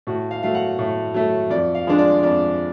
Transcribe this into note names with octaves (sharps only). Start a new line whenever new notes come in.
A2 F#4
F5
F#3 A3 F5
F#5
A2
F#3 A3
F2 D5
F5
F3 G#3 D4
D5
F2 D5